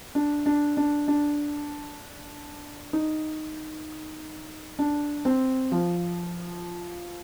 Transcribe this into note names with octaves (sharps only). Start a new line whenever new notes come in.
D4
D4
D4
D4
D#4
D4
C4
F3